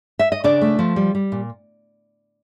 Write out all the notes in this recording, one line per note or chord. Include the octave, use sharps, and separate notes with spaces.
E5
D#5
C#3 D4 D5
A3
F3
G3
G3
A#2